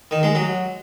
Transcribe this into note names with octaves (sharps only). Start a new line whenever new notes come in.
D#3
G#3
F#3